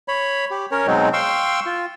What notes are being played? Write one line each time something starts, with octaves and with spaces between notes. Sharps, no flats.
C#5 B5
G4
C#4 A#4 C#5
B2 F#3 G#3 C4 D#4
F5 G5 C6 C#6 E6
F4